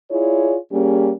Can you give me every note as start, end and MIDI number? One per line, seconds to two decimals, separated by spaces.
0.11 0.56 64
0.11 0.56 65
0.11 0.56 68
0.11 0.56 73
0.11 0.56 74
0.72 1.11 55
0.72 1.11 58
0.72 1.11 61
0.72 1.11 67
0.72 1.11 68